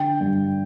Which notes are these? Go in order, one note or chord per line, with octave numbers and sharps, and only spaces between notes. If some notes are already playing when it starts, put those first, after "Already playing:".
Already playing: D3 G5
G2